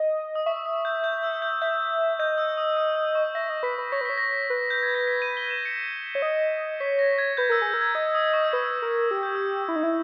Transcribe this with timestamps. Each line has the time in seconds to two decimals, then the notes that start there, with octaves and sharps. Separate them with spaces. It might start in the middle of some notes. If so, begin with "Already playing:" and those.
Already playing: D#5
0.35 D#6
0.46 E5 C#6
0.56 C#6
0.66 D#6
0.85 G6
1.04 G6
1.23 E6
1.42 G6
1.62 E5 G6
2.19 D#5 G6
2.38 E6
2.57 D#6
2.77 E6
2.96 D#6
3.15 C#6
3.35 E5 A#6
3.49 D#5
3.63 B4 B6
3.78 B4
3.92 C#5 A#6
4.01 B4
4.05 C#5 B6
4.18 A#6
4.50 B4
4.70 G6
4.83 G#6
4.95 A#6
5.07 B6
5.22 D#7
5.37 G7
5.50 E7
5.65 C#7
6.15 C#5
6.22 D#5
6.80 C#5 B6
6.99 A#6
7.18 G#6
7.37 B4 G6
7.49 A#4 E6
7.62 G#4
7.67 G6
7.74 A#4
7.81 G#6
7.95 D#5 G#6
8.15 D#6
8.33 C#6
8.44 E6
8.53 B4 D#6
8.82 A#4
9.11 G4 E6
9.23 G6
9.35 E6
9.68 E4
9.76 D#4
9.83 E4